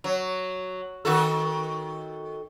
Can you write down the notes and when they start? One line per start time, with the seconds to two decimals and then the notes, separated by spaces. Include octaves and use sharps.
0.04 F#3
1.05 D#3 F#4 A4